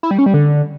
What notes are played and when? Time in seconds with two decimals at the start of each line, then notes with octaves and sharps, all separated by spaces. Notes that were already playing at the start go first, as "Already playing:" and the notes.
0.03 E4
0.11 G3
0.19 C#4
0.26 G3
0.34 D3